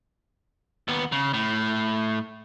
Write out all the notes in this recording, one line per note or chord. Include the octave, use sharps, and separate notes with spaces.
D#2 B3
C#3
A2